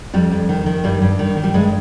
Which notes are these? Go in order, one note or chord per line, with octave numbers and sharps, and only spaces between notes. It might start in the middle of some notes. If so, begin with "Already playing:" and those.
F2 G3
F2
D#3
D#3
G2 G3
G2
D#3
D#3
G3
G2 G#3